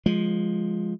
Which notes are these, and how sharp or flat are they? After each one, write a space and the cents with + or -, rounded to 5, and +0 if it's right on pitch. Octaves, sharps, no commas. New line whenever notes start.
F3 +5 G#3 +0